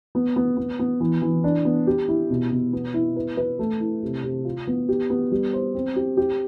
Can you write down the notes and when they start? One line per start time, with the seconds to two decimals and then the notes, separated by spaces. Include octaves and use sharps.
0.15 B3
0.36 B3
0.57 B3
0.79 B3
1.00 E3
1.22 E3
1.44 D4
1.65 B3
1.87 G4
2.08 E4
2.30 B2
2.51 B2
2.73 B3
2.94 E4
3.16 B4
3.37 B4
3.59 A3
3.80 E4
4.03 C3
4.24 C3
4.45 F4
4.67 B3
4.89 G4
5.10 B3
5.32 G3
5.53 C5
5.75 C4
5.96 G4
6.17 G4